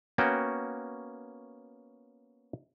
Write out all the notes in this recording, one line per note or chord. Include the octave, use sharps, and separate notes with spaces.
A#3 B3 C#4 F#4 G5